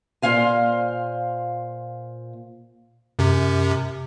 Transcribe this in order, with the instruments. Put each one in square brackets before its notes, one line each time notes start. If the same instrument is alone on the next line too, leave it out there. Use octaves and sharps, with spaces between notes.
[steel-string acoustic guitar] A#2 C5 F5 G#5
[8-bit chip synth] F#2 C3